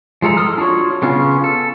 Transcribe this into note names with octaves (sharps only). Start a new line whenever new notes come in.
F3 G#3 A4 A#5
A4 D#6 F6
D4 F4 F#4 C#5
C#3 B3 C#4 F4
A4